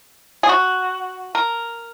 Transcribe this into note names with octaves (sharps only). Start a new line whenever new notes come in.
G#4
F#4
A#4